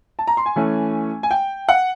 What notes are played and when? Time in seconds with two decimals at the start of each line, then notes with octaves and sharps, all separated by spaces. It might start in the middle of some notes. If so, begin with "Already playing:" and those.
0.19 A5
0.27 A#5
0.37 C6
0.46 G#5
0.56 E3 A3 C#4
1.23 G#5
1.31 G5
1.69 F#5